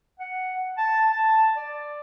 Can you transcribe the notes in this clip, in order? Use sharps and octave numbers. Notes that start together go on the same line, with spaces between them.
F#5
A5
A5
D5